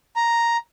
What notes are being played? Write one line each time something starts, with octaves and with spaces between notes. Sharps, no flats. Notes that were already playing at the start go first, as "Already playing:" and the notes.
A#5